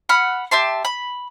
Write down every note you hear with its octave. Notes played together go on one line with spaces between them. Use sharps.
F#5 B5 F6
G4 E5 A5 C6
B5